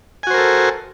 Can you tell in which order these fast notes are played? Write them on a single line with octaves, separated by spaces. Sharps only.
G#5 F#4 C5 A#4 A4